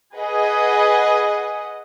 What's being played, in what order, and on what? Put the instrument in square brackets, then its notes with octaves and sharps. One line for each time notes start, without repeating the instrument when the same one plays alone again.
[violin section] G#4 B4 D#5 F#5